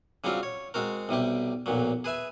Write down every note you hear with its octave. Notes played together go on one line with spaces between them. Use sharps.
C#3 F#3 G3 C4 F4
C#5
G#3 C4 F#4 A#4
B1 C3 G3 G4
B1 F2 A#2 F#3
G#4 B4 E5 G#5